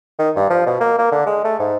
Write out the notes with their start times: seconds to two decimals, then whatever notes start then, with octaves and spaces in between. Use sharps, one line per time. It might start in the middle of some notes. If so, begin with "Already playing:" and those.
0.19 D#3
0.36 G2
0.50 F3
0.66 B2
0.80 A#3
0.98 A#3
1.12 D3
1.26 G#3
1.44 A3
1.59 G#2